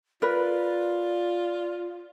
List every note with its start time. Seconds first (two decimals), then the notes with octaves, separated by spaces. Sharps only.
0.22 F4 A#4 B4 D5